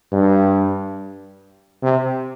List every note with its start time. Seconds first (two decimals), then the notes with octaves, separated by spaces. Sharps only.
0.12 G2
1.83 C3